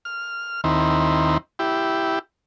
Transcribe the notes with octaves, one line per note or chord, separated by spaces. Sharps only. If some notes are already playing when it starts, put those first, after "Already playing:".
F6
D#2 D#3 C4 E4
E4 G4